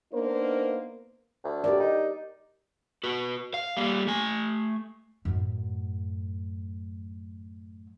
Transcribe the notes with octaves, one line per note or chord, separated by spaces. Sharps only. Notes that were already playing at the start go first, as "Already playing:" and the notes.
A#3 B3 D4 D#4 A#4 C5
D2
G4 A#4 D5
D#4
F#4 B4
F5
G3 A#3
A3 G#5
F#2 A2